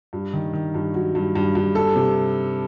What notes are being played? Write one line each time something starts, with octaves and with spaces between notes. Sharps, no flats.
G2
D#3
D#3
G2
F#3
G2
G2
G2
A4
C3